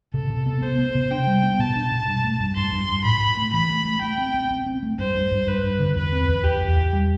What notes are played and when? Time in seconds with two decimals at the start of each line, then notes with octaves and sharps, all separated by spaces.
0.14 C3 A4
0.30 C3
0.46 B3
0.62 B3 C5
0.78 B3
0.95 C3
1.11 D4 G5
1.27 G3
1.43 B3
1.59 B2 A5
1.76 D4
1.91 B2
2.07 G2
2.24 A3
2.40 G2
2.56 G2 C6
2.72 G2
2.89 G2
3.04 A2 B5
3.21 A2
3.37 A3
3.53 E3 B5
3.70 A3
3.85 A3
4.01 A3 G5
4.18 C4
4.34 C4
4.51 C4
4.66 C4
4.83 A3
4.99 G2 C5
5.15 G2
5.32 G2
5.47 G2 B4
5.63 G2
5.79 D3
5.96 E2 B4
6.12 C4
6.28 E2
6.44 E2 G4
6.61 E2
6.77 E2
6.93 G3